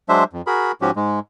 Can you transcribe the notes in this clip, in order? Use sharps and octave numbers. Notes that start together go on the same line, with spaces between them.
F#3 G#3 D4 C5 E5
F2
F#4 G#4 A#4 B5
G#2 F3 C#4 F#4 G4
G#2 G#3